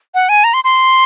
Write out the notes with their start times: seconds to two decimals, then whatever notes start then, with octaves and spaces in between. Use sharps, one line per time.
0.15 F#5
0.29 G#5
0.44 A#5
0.54 C6
0.64 C6